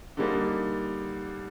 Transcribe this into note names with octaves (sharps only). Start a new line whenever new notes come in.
D3 G3 A#3 D#4